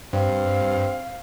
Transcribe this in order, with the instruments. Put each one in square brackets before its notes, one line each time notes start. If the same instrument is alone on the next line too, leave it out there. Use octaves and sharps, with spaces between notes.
[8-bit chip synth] G2 [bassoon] C4 [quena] F5